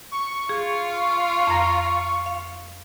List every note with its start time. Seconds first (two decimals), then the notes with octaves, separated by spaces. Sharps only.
0.12 C#6
0.49 F4 G#4
1.47 F2 A#5 A#6
2.26 F5